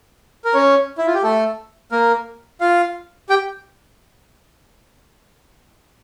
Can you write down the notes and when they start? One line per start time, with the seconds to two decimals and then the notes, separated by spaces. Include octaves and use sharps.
0.45 A#4
0.54 C#4 C#5
0.98 E4
1.07 F4
1.14 G4
1.23 A3 A4
1.91 A#3 A#4
2.61 F4 F5
3.29 G4 G5